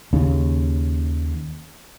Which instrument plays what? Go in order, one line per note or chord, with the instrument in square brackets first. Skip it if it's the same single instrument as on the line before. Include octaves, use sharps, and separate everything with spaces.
[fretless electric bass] D#2 C#3